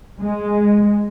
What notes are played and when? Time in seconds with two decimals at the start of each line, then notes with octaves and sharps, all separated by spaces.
0.19 G#3